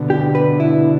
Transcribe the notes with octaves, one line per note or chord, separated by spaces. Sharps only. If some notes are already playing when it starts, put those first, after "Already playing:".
Already playing: B2 D3
G4
B4
E4